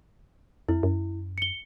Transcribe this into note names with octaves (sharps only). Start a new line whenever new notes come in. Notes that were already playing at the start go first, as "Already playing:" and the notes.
F2 E4
F#2
C#7 G7